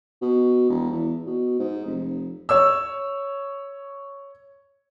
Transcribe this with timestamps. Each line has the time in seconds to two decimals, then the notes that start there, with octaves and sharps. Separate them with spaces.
0.22 B2
0.70 E1
0.91 E2
1.27 B2
1.59 G#2
1.85 F1
2.49 C#5 E6